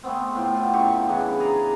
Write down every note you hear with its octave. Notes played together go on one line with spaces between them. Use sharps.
G#3 A3 B3 C4
A2 F4 G5
B2
F#2 G4 C#6
C#3 E3 D4 G#4
G#4 D5 A#5